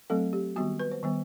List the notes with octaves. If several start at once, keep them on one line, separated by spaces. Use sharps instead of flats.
F#3 A3 C4 A4
G4
D#3 G3 B3 F#4
B4
C5
D#3 G3 B3